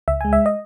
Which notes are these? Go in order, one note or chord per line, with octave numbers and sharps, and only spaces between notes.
C#2 E5
G#3 G#5
E5
D#5